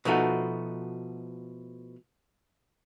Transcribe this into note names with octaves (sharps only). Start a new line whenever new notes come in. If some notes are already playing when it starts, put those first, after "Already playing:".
B2 F3 A3 D#4 F#4